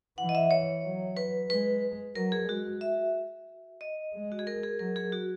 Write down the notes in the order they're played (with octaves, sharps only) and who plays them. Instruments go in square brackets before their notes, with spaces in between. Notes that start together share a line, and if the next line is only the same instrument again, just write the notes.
[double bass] E3 [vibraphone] F#5
[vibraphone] D#5
E5
C#5
[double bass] F#3
[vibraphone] B4
[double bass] G#3 [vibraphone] B4
[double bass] F#3 [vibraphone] A#4
[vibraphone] G#4
[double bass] G#3 [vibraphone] F#4
[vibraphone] E5
D#5
[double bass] G#3
[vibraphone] F#4
G#4
A#4
G#4
[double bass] F#3 [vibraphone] A#4
[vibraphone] G#4
F#4